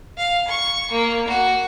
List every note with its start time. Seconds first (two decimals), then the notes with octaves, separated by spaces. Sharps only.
0.18 F5
0.48 C#6
0.91 A#3
1.28 F#4